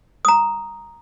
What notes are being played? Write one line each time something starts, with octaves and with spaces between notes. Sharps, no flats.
A#5 D#6